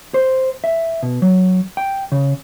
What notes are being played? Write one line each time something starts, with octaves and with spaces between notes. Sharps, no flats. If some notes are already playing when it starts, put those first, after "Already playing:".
C5
E5
B2
F#3
G5
C#3